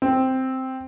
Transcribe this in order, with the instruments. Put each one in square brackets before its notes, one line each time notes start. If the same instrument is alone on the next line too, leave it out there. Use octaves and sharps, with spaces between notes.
[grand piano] C4